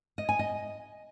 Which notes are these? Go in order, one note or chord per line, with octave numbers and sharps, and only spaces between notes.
D#5
G#5
D#5